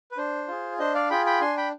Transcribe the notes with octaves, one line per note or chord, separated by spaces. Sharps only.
B4
D4 C5
F4 G#4
D4 C5 D#5
D5 F5
F4 G#4 G5 B5
G5 B5
D4 G#5 C6
G5 B5